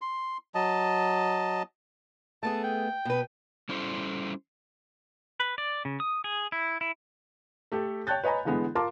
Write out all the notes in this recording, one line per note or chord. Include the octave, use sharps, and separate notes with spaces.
C6
F#3 D#5 A5
A3 B3 G#4 A5
G5
B2 B4
G3 C#4 E4 A4 C5
B4
D5
C#3
D#6
G#4
E4
E4
A3 G4 A4
C#5 G5 A5 F#6 G6 A6
B4 C#5 D#5 G#5 A#5 B5
D3 E3 G#3 B3
F4 A#4 A5 C6 D6